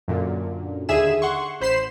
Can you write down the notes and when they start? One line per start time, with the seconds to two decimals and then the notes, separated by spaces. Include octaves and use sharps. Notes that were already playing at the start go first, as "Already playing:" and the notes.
0.08 F#2 A#2 D3
0.89 D#2 D3 G#4 E5 G#5 E7
1.22 F#5 C6 C#6
1.60 A1 C5 B5 C7 E7